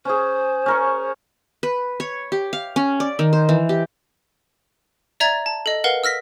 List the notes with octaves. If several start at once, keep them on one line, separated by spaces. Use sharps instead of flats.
C#4 G#4 C5
C#4 A#4 C#6
B4
C#5
G4
F5
C#4
D5
D#3
C5
E3
G4
D5 E5 A#5 G#6 A6
A5
A4 D#5
A#4 B4 F5 F#5
E6 F6 A#6 B6